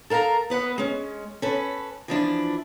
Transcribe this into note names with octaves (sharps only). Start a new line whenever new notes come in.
A4 A#4 F5 G5 A#5
B3 B4 F#5
G#3 C#4
C#4 A4 B4
E3 F3 D4 E4